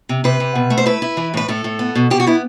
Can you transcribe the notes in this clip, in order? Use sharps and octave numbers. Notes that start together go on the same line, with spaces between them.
C3
C3 B4
C3
B2
A3
C5
E4 B4
E4
E3
A2 B4
A2 A4
A2
B3
B2
B2 G4
F#4
B3 E4